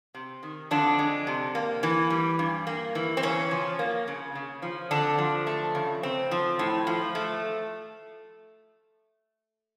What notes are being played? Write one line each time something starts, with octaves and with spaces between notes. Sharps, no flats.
C3
D#3
F2 D3 D4
G#3
C3
A#3
E3
G3
G2
A#3
E3
C4
C#3 C#4
F3
A#3
C#3
C#3
F3
D3 C4 D4
F3
A3
C#3
C4
F3
A2
F3
A3